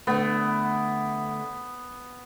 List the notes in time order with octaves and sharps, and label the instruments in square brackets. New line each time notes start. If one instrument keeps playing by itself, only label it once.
[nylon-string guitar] D3 A3 [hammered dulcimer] B3